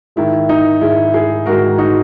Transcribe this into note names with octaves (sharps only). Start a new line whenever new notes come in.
G#2 D#3 G#3 E4
D#4
G#2 D#3 G#3 E4
E4 G#4
G#2 D#3 G#3 F#4 A#4
D#4 F#4